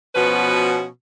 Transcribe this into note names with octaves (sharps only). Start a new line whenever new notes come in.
B2 F3 B3 C#4 F#4 B4